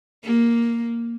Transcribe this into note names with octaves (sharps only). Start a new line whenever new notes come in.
A#3